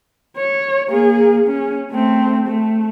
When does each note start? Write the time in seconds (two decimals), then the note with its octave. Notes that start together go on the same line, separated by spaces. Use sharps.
0.36 C#5
0.89 A#3 G#4
1.48 C#4
1.91 A3 C4
2.47 A3